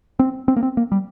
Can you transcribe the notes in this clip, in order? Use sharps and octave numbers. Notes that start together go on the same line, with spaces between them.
C4
C4
A#3
C4
A#3
G3